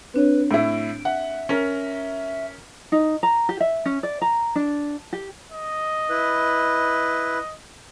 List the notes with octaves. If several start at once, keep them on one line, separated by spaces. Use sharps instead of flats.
C4 D4 B4 C#5
A2 E4 D7
E5 F#5
C#4 A#4
D#4
A#5
G4
E5
C#4
D5
A#5
D4
G4
D#5
E4 B4